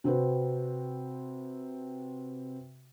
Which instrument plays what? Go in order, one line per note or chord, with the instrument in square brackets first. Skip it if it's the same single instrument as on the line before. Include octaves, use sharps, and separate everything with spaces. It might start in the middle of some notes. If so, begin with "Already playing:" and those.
[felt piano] C3 C4 F#4 B4